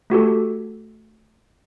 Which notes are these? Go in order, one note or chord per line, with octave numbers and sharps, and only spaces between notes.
A3 F#4 G4 A4